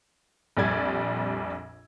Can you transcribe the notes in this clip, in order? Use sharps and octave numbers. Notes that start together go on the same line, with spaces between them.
A#1 F2 G3 D5 G#6